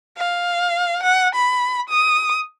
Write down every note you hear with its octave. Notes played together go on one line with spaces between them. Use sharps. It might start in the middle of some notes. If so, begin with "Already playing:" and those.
F5
F#5
B5
D#6